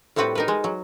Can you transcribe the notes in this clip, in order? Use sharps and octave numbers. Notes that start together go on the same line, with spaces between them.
A2 G3 C4 F#4 B4 F#5
D#4 A#4 B4
G#3
F#3